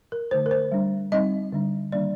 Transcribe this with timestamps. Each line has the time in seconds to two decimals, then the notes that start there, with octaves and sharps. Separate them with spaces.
0.12 A#4
0.31 D3 A3 D#4 C5
0.46 A#4
0.51 C5
0.72 G3 D4
1.12 G3 C4 D#4 D#5
1.53 D3 G3 D4
1.92 D#3 G3 A#3 D4 D5